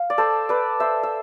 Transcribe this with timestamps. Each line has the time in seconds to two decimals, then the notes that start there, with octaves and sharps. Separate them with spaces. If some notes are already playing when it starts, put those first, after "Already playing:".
Already playing: F5
0.10 D5
0.18 A4 C5
0.49 B4 D5
0.80 C5 E5
1.03 E5